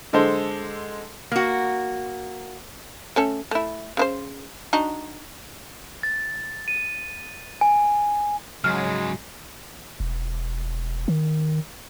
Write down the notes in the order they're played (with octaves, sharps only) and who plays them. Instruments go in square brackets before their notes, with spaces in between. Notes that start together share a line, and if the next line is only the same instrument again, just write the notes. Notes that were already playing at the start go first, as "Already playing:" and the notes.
[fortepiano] D3 G#3 A4 C5
[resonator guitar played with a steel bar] A#3 F#4
[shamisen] A3 C#4 A4
A3 E4
C#3 C4 C5
D4 D#4 F#4
[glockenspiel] A6
D#7
G#5
[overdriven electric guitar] G#2 C#3 [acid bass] F#3 [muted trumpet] G#3 [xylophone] F6
[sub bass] E1
D#3